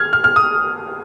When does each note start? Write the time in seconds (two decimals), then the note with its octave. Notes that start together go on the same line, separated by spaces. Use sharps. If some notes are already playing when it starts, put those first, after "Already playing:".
Already playing: F6 G#6
0.13 F6
0.24 F6
0.36 D#6